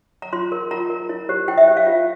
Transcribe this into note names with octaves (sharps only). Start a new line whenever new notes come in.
A#5
F4 C6
A#4
F4 A#5
A#4
E4
G4 C5
E4 G5
E5
G4 C5
F5
F4